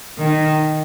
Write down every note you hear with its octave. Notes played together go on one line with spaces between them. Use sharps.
D#3